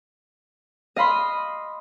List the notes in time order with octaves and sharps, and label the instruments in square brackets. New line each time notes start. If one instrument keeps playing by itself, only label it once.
[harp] D#5 F5 B5 C6